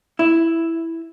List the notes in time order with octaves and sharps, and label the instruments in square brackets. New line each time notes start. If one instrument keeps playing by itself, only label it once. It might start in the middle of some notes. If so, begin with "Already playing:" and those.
[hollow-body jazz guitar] E4